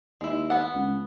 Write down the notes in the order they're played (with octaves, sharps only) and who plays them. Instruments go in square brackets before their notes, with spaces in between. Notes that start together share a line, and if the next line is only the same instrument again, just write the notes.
[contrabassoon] D#2 [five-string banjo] G#3 E4
[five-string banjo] B3 F#5
[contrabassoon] C#2